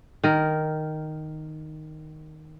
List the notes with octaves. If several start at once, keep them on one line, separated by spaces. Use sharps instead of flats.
D#3 A#4